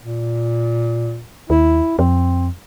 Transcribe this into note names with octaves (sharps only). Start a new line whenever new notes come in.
A#2
D#2 E4
F2 C4